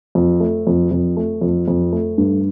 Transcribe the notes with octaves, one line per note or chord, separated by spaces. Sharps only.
F2
A3
F2
F2
A3
F2
F2
A3
G2